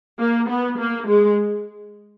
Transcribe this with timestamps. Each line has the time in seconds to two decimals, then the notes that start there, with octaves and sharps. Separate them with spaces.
0.19 A#3
0.49 B3
0.78 A#3
1.08 G#3